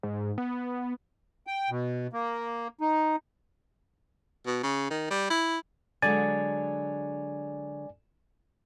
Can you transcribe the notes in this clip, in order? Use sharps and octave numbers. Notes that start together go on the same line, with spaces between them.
G#2
B3
G5
B2
A#3
D#4
B2
C#3
D#3
G3
E4
D3 F#3 G#3 D5 G#5 A6